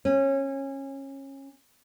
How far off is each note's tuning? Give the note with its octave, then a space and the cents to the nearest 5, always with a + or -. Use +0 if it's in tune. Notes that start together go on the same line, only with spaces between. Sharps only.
C#4 -25